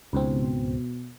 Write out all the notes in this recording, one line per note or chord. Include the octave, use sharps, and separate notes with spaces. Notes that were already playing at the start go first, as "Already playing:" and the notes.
C#2 G#2 B2 C4